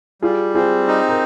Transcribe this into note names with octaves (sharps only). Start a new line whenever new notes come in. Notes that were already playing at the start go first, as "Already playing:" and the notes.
G3 F4 G#4
C4 F4 G#4
D#4
A#4